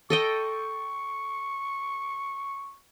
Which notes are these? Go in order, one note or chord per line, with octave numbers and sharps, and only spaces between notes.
A4 D#5 G5 C#6